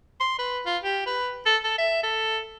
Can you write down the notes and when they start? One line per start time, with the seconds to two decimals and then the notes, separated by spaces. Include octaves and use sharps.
0.20 C6
0.39 B4
0.66 F4
0.83 G4
1.06 B4
1.46 A4
1.64 A4
1.78 E5
2.03 A4